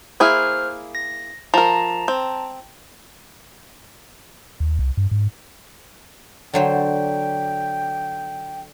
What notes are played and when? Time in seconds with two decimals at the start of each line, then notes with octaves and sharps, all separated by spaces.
0.20 A#3 E4 G#4 C5 F6
0.95 A#6
1.54 F3 A#4 A5 A#5
2.08 C4
4.60 D#2
4.79 C2
4.97 G2
5.11 G#2
6.54 D3 F#3 C5 G5